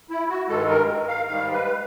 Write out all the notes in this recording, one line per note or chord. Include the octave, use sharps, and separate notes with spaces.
E4
F#4
G2 D#3 G#3 A4
A#4
F5
G#2 D#3 G3 F5
B4